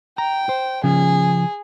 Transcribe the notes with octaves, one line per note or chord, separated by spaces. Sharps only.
G5 A#5
C5
C#3 F3 C#4 G#4